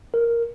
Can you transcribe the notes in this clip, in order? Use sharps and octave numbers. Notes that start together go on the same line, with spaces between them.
A#4